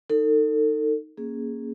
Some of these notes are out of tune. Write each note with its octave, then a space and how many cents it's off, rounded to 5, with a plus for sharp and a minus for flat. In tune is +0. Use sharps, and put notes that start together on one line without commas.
D#4 +0 A4 +35
A#3 +0 C#4 +0 G#4 +0